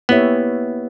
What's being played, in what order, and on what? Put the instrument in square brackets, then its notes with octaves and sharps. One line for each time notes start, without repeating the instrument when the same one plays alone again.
[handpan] A#3 E4 G4 C#5 E5 [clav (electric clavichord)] B3